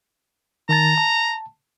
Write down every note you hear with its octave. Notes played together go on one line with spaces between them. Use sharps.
D#3 A5 A#5 A6
A5